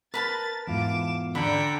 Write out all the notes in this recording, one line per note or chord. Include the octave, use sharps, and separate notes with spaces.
A#4 B4 A5 B5 A6
E2 G#2 F4 D6 E7
D3 G5 A#5 B5